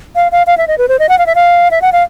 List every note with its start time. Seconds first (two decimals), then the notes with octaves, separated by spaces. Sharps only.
0.15 F5
0.32 F5
0.47 F5
0.58 E5
0.68 D#5
0.78 B4
0.88 C5
0.99 D#5
1.09 F#5
1.19 F5
1.26 E5
1.35 F5
1.71 E5
1.82 F#5
1.92 F5